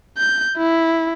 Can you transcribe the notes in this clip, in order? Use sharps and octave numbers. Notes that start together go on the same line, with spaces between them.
G6
E4